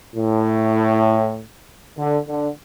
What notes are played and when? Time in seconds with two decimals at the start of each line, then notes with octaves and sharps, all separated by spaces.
0.15 A2
1.97 D3
2.27 D3